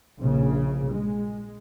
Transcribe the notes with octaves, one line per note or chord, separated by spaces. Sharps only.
A#1 C#3
G#3